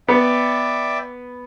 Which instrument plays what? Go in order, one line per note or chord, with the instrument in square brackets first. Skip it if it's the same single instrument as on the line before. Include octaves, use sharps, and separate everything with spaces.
[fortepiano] B3 [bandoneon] D5 E5 G5